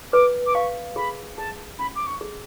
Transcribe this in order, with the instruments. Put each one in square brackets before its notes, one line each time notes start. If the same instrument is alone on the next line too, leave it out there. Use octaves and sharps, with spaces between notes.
[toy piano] B4 [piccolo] D6
[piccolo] D6
[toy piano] F5 [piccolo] C#6
[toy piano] G#4 [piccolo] B5
[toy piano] G#4 [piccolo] A5
[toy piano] C#4 [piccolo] B5
[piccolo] D6
C#6
[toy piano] G#4